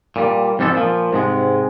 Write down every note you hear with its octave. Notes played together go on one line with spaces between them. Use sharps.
A#2 G3
F2 G#2 G3 G#3 A4
A#2 F3
G#2 C3 G#3